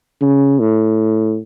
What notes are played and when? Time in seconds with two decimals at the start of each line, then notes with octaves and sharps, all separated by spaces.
0.21 C#3
0.60 A2